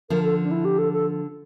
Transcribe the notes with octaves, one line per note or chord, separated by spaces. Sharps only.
D3 F3 A#4
A4
D4
E4
G4
A4
A4